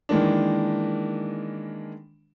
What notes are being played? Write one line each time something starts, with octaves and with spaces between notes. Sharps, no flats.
D#3 E3 G#3 A#3 D4